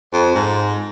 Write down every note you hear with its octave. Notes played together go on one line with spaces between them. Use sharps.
F2
G#2